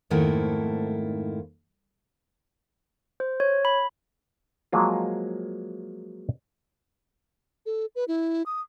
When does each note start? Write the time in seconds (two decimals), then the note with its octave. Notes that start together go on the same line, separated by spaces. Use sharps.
0.10 F2 G#2 D#3 A3 A#3 E4
3.20 C5
3.40 C#5
3.65 B5
4.73 F3 F#3 G#3 A#3 F4
7.66 A4
7.95 B4
8.08 E4
8.46 D#6